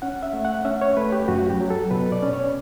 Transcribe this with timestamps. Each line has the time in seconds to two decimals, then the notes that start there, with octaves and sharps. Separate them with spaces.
0.02 C#4 F#5
0.23 E5
0.33 A3
0.45 F#5
0.65 C#4 E5
0.82 C#5
0.97 A3 B4
1.12 G4
1.28 F#2 F#4
1.50 G4
1.60 F#3
1.70 A4
1.91 B2 B4
2.12 D5
2.23 C#4
2.33 C#5